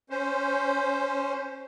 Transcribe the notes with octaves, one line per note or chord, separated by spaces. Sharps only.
C#4 C5